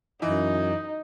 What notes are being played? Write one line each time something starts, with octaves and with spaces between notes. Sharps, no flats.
F#2 E3 D#4